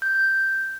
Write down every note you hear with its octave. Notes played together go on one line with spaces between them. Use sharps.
G6